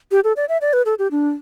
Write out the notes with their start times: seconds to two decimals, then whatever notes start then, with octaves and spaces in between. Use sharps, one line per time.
0.11 G4
0.24 A4
0.37 D5
0.49 E5
0.61 D5
0.73 B4
0.86 A4
0.99 G4
1.11 D4